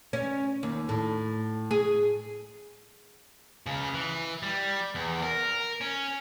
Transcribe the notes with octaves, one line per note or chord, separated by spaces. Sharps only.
C#4
D#2
A2
G#4
C#2 C#3
E3
G3
E2
A#4
C#4